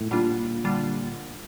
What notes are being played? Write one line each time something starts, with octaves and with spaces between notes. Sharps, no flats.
A2
A#2 D3 G3 D4 F4
D3 G3 D4 F4